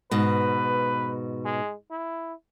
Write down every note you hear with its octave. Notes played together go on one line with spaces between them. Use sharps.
G#2 B2 B4
G#3
E4